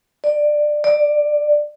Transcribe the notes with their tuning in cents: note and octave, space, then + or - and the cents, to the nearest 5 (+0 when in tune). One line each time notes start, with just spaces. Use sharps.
D5 +15
D5 +10